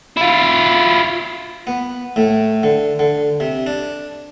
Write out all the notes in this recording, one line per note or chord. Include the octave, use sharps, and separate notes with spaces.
E4 F4
B3
A2
D3
D3
C3
D4